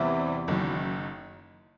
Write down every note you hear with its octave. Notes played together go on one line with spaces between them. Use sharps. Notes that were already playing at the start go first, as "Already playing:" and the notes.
Already playing: E2 C3 E3 G3 C4
F#1 F#2 D#3